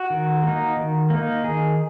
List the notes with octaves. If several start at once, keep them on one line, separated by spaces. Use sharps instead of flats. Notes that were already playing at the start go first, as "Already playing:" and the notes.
Already playing: F#4
D#3
A#3 D#4
D#3
A#3 D#4
D#3 G#4